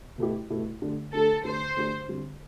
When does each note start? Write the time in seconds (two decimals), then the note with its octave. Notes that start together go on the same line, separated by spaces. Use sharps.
0.18 B2 A3 E4 G4
0.50 B2 A3 E4 G4
0.82 D3 A3 D4 G4
1.13 D3 A3 D4 G4 A4
1.45 D3 A3 D4 G4 C5
1.76 D3 A3 D4 G4
2.08 D3 G3 C4